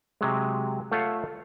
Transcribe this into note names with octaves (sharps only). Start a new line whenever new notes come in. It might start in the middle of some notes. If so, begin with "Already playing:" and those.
C3 F#3 G#3
A3 F4 A4 C#5 F5 F#5